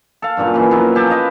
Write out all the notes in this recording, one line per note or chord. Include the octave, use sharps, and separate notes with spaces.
A4 F5
G2 A#2 C#3 F#3
C#3 E3
B2 F3 F#3 A#3
C#4 G4 A4 A5
B4 D#5 F5